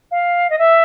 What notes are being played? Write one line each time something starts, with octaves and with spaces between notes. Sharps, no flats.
F5
D#5
E5